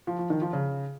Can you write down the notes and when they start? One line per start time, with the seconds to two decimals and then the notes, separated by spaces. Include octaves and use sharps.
0.07 F3
0.19 F3
0.30 D#3
0.42 F3
0.53 C#3